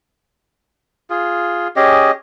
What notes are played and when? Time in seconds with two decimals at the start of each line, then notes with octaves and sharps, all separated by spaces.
1.10 F4 G#4
1.76 C#4 G4 G#4 D#5